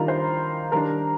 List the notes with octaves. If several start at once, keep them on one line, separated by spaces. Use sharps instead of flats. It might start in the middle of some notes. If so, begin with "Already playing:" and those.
Already playing: D#3 G3 D4 F4 A#4 F5 A#5
C5 C6
D#3 G3 D4 A#4 A#5